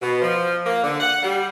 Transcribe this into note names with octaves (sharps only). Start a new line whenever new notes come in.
B2
F3
A#3
D3
F#5
G3